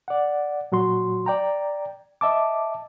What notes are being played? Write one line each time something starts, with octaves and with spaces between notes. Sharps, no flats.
D5 F#5
A#2 F#3 F#4 C6
D5 G5 A#5
D#5 E5 A5 D6